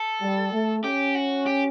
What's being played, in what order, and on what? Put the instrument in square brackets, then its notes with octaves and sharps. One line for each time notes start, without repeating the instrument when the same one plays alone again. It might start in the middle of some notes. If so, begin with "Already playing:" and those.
Already playing: [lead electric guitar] A4
[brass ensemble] G3
A3
[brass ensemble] C#4 [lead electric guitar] G4
[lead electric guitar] F#4
G4